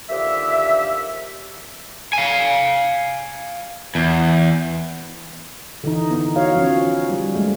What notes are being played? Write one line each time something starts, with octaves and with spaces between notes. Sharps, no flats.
D#2 D3 F3 G4 E5
F5 G#5
E2
D3 E3 D#4
B3 D#4
F#4 C#5 F5
F3 C#4
G3
G#3 A3